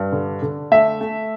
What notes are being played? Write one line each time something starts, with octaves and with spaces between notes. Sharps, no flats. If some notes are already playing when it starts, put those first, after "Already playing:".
Already playing: G2
D3
D3
A3 E5
A3